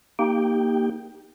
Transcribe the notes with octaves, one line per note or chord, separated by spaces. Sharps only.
A#3 D#4 G4 G5